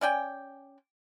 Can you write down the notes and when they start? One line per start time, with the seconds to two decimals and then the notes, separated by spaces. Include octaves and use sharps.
0.01 C#4 D5 G5 G#5